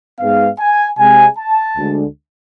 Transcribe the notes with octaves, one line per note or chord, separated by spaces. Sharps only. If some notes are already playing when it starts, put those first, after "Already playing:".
G#2 G#3 B3 F5
G#5
C3 G#3 C4 G#5
A5
D2 D3 G#3